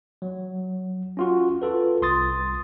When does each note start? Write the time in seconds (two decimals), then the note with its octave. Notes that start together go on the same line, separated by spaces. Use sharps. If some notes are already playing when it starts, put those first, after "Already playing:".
0.22 F#3
1.17 C#4 F4 F#4
1.62 F4 A4 B4
2.02 C2 C6 D#6 A6